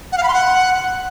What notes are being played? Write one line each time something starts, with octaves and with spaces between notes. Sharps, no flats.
F#5
F5
B5
C6
F#5